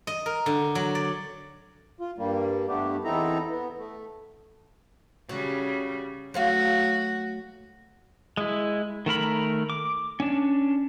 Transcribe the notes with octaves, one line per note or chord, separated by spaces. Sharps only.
D#5
A#4
D3
F#3
D5
F4
G2 G3 A#3
G2 A3 B3 D4 G4
E2 C4 D#4 E4 A4 A#5
B3
A3
C#3 F#3 G3
F#3 A3 F#4 C#5 F5
G#3 E4
D#3 A3 A#4 B5
D6
C#4 D4